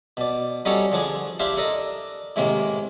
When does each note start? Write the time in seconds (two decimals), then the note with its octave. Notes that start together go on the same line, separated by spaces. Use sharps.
0.17 B2 D5
0.65 G3 C#4 D#4 F#4 A4 C#5
0.92 D3 F3 D4 G#4
1.39 D4 E4 G4 C5 F5 G5
1.57 D4 A4 A#4 D#5
2.36 A2 C3 D#3 G#3 A#3